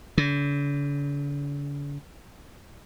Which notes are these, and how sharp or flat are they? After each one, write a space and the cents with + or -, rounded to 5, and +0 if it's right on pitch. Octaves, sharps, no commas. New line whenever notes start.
D3 -45